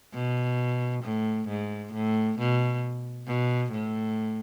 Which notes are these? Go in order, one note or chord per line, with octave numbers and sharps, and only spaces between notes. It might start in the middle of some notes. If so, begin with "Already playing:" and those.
B2
A2
G#2
A2
B2
B2
A2